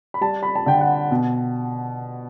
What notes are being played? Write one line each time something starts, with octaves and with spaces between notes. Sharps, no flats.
B5
G3 A5
B5
A5
D3 G5
F#5
B2